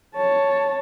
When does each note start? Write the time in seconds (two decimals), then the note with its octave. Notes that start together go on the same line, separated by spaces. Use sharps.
0.15 C#5 A5